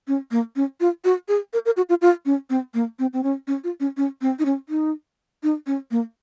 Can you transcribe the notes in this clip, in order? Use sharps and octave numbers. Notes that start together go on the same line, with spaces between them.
C#4
A#3
C#4
F4
F#4
G#4
A#4
A#4
F#4
F4
F4
C#4
C4
A#3
C4
C4
C#4
C#4
F4
C#4
C#4
C4
D#4
C#4
D#4
D#4
C#4
A#3